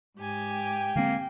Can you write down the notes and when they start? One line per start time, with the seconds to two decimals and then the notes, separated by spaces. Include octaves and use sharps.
0.17 G#2 G4 G#5
0.53 G5
0.96 D3 G#3 A#3 C4